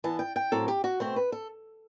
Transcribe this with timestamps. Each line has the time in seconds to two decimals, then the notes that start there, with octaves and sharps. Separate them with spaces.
0.04 E3 B3 A5
0.19 G5
0.36 G5
0.52 A2 F#3 C4 A4
0.68 G4
0.84 F#4
1.00 B2 A3 C4 C5
1.16 B4
1.32 A4